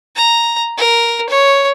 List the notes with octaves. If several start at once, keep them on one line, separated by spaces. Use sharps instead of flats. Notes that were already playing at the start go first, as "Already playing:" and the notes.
A#5
A#4
C#5